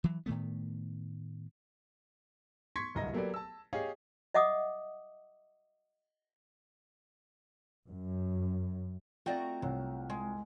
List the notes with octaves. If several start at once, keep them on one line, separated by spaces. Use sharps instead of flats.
E3 F#3
A2 D#3 A3 B3
C6 C#6 G#6 B6 C#7
D1 C2 D#5 A#5 A#6
F#3 A#3 G4 A4 B4 D5
A5 E6
G4 G#4 C#5 D#5 F5
D#5 E5 F#5 D6 D#6
F#2
A3 C4 F4 F#4 D5 D#5 G5 A#5
C2 F#3
G#3